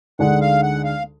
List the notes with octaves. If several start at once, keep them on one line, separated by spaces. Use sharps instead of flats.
D2 D3 G#3 D#4 F#5
F5
F#5
F5